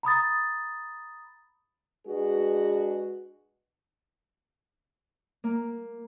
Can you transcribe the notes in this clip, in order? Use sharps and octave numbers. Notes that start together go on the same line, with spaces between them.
A#5 B5 D#6 A6
G#3 D4 F#4 G#4 B4
A#3